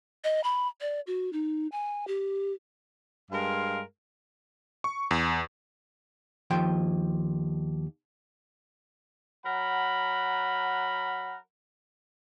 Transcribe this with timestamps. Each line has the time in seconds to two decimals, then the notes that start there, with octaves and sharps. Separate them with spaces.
0.24 D#5
0.44 B5
0.81 D5
1.07 F#4
1.33 D#4
1.72 G#5
2.07 G4
3.31 G2 G#3 A#4 F5 C6
4.84 C#6
5.11 E2
6.50 D#2 F3 G5 C6
9.45 F#3 A#4 F#5 B5